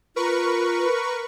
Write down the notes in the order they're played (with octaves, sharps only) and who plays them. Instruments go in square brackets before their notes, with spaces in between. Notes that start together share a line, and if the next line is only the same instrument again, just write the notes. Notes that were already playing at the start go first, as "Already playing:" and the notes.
[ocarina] F4 [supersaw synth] A#4 B4 C#6